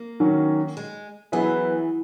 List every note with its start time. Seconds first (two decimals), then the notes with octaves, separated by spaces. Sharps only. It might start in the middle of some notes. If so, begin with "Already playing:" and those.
Already playing: A#3
0.20 D#3 F#3 C#4
0.77 G#3
1.32 E3 F#3 B3 E4 G#4 B4